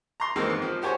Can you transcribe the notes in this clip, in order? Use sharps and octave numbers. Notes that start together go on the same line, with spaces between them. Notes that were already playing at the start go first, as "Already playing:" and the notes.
A#5 C6
D#3 E3 G#3 A#3 C4 D#4
G#2
F3
F#4 G4 C5 C#5 G#5